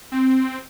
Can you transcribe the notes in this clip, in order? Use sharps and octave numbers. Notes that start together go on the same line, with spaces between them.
C4